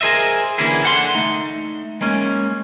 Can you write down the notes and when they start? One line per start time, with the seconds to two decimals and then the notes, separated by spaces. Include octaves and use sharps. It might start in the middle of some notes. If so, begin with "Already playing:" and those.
0.01 G#4 A#4 C5 D#5 E5
0.58 D3 E3 A#3 C#4 E4 G#4
0.83 D3 F#5 C6
1.15 A3 D#4
2.01 G#3 A#3 C#4